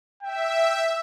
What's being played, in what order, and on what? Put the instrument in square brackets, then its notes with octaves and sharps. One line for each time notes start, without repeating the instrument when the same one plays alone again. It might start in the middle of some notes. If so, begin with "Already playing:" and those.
[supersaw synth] E5 [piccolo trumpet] G5